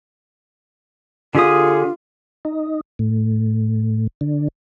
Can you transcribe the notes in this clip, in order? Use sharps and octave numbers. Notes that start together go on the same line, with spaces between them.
D3 F4 G4 G#4 D#6
D#4
A2
D3